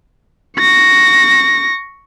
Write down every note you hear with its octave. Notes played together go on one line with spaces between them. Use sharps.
C#6 A#6